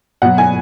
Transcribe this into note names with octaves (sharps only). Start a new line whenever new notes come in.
B2 F#3 F#5
G#5